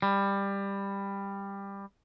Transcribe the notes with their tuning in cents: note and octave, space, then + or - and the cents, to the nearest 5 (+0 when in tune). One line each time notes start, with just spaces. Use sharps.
G3 +15